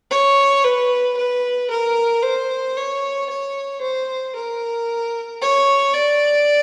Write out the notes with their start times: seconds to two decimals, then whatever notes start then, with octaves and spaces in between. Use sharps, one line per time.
0.11 C#5
0.64 B4
1.17 B4
1.70 A#4
2.22 C5
2.76 C#5
3.29 C#5
3.81 C5
4.35 A#4
5.42 C#5
5.94 D5